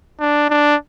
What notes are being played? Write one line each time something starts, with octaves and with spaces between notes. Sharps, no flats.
D4
D4